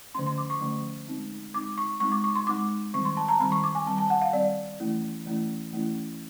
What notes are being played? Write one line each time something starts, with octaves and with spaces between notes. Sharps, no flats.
D3 F3 A3 C#4 C6
C6
D6
C#6
D3 F3 A3 C#4
G#3 C4 D#4
G#3 C4 D#4 D6
C#6
G#3 C4 D#4 C#6
D6
C#6
C6
G#3 C4 D#4 D6
D#3 G3 C4 C#6
C6
A5
A#5
D#3 G3 C4 B5
C#6
D6
G#5
D#3 G3 C4 A5
A5
F#5
F5
D#3 G3 C4 D5
E3 A3 C#4 E4
E3 A3 C#4 E4
E3 A3 C#4 E4